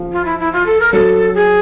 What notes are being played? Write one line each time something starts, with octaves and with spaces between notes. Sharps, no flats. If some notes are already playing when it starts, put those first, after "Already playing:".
Already playing: F3
F4
E4
E4
F4
A4
A#4
F#3 A4
G#4